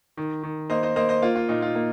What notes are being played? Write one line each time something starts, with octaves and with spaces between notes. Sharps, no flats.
D#3
D#3
A#3 C5 D#5
C5 D#5
A#3 C5 D#5
C5 D#5
A#3 F4
F4
A#2 D#4
F4
A#3